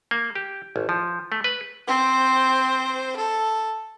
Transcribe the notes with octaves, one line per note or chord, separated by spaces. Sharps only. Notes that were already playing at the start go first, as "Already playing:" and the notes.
A#3
G4
A1
F3
A3
B4
C4 C5
A4